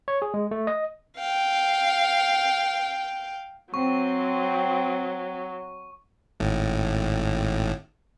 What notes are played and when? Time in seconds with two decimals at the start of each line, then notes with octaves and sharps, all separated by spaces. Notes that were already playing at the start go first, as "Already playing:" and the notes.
0.08 C#5
0.22 G#4
0.34 G#3
0.51 A3
0.67 D#5
1.17 F5 G5
3.74 F#3 C4 C#6
6.40 G#1 A2